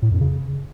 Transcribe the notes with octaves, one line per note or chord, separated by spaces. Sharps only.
A2
F2
C#3